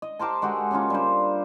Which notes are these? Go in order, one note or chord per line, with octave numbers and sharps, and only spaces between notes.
D#5
G4 A#4 C5 A5
G#3 F#4 G4 A4
C#3 A#3 C#4 F4
G3 D4 C5